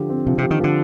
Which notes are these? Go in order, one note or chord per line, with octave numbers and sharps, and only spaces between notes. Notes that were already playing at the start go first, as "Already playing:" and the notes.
Already playing: D3 F3 G4
C4
C3 F3
C3
G4
D#3
D3 F3